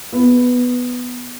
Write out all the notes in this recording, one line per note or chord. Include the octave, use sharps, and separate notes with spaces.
B3